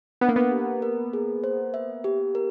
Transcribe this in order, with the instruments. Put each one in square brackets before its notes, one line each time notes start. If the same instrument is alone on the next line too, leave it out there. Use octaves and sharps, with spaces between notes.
[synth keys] B3 [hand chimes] D4
[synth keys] A#3
B3
[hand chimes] G4
A#4
G#4
C5
E5
G4
A#4